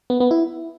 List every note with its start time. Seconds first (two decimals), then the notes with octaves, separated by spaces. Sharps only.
0.10 B3
0.20 B3
0.31 E4